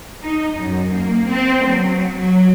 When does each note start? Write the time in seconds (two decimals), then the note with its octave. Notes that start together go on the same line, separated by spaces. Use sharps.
0.23 D#4
0.57 F#2
0.95 A#3
1.30 C4
1.67 F#3
2.20 F#3